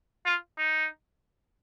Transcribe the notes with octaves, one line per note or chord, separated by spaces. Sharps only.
F4
D#4